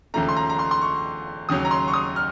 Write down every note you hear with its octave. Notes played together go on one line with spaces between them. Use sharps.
D#2 C#3 F3 A3 A#5
C6
A#5
A#5
C6
C6
C#6
D#2 C#3 F#3 D#6
A#5
C6
C#6
D#6
F6